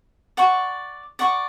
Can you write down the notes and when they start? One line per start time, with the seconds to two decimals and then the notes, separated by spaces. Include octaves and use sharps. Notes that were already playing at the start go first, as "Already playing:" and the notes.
0.37 D5 F#5 C#6
1.19 D5 F#5 C#6